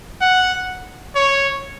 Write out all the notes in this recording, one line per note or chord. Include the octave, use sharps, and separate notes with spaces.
F#5
C#5